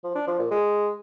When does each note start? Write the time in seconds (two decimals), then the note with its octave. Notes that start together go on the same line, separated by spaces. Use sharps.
0.04 F3
0.15 D4
0.27 F3
0.39 A#2
0.51 G#3